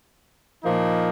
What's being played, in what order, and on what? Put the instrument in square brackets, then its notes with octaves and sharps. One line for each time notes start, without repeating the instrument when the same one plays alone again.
[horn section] A#2 F3 A#3 D#4